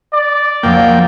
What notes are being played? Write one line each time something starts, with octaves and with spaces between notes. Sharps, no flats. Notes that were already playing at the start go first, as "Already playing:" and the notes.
D5
F2 F3 F#3 A#3 G5